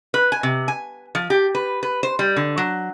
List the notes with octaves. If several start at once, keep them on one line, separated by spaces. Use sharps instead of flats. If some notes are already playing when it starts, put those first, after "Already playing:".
B4
G#5
C3
G#5
F3
G4
B4
B4
C5
G3
D3
F#3